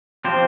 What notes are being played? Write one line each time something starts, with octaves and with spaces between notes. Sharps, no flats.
F3 C4 G4 C5